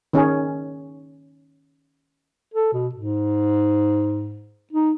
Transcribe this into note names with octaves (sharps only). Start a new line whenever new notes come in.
D#3 C#4 G#4
A4
B2
G#2
D#4